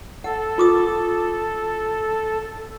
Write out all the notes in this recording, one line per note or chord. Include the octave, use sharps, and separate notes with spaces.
A4 F#5
F4 D6 D#6